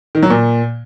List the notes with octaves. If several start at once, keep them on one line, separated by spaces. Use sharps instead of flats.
D#3
F#3
A#2